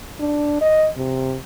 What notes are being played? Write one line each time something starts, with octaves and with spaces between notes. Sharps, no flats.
D4
D#5
C3